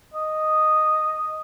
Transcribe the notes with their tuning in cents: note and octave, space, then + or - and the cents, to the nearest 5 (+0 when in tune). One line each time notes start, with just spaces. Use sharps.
D#5 -5